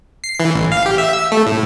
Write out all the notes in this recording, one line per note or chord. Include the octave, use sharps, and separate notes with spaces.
C7
E3
A1
F5
G4
E5
E6
A3
A2